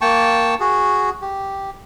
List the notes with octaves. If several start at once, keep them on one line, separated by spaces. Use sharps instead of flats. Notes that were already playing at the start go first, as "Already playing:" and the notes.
A#3 G5 A5 C#6
F#4 G#4
G4